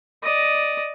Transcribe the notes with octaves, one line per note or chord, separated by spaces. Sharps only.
D5 D#5